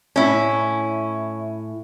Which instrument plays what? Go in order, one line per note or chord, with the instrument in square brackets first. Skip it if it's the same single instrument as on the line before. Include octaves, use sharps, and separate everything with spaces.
[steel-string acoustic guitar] A2 [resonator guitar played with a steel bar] C#4 E4